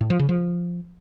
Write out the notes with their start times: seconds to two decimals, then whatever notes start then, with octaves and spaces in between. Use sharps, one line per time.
0.01 A2
0.10 F3
0.19 C#3
0.29 F3